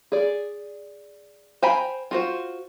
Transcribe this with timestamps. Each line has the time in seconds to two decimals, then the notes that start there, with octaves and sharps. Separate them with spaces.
0.12 G#4 D5
1.62 C5 G5 G#5 A#5 B5
2.11 F4 F#4 C5